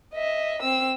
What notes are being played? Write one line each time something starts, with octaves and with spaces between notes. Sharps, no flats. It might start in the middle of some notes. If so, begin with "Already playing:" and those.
D#5 E5
C4 E6